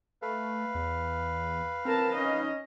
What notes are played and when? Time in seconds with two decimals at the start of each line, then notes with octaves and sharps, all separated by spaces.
0.22 A3 B4 F5
0.75 E2
1.85 C4 A#4 A5
2.15 C#4 D#4 D#5